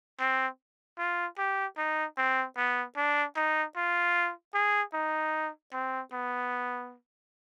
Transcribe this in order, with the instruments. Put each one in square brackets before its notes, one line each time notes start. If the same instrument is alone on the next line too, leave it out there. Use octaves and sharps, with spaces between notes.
[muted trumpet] C4
F4
G4
D#4
C4
B3
D4
D#4
F4
G#4
D#4
C4
B3